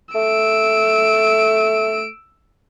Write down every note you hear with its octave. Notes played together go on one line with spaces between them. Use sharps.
A3 E6 D7